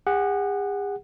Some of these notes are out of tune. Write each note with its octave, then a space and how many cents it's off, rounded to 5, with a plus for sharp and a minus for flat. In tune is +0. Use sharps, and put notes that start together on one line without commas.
G#4 -45 F#5 +0